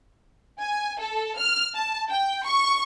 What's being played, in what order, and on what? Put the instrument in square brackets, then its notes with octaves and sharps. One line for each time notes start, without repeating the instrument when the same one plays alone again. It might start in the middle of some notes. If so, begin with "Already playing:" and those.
[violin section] G#5
A4
F6
A5
G5
C#6